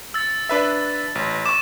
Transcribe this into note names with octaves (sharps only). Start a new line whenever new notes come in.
E6 A6
D4 B4 E5
A1
C#6 D6 E7